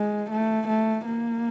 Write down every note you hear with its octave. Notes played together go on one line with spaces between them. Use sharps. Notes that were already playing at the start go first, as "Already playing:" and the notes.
Already playing: G#3
A3
A3
A#3